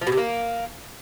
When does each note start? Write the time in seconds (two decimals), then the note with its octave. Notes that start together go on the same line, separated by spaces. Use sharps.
0.01 F3
0.07 B2
0.12 C3
0.17 A#3